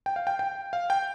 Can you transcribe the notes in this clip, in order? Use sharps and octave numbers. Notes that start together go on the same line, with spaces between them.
G5
F5
G5
G5
F5
G5